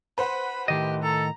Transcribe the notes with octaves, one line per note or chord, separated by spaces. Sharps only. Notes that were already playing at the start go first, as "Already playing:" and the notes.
B4 C5 F#5 B5
A2 D#3 G4 D#5
A4 A#5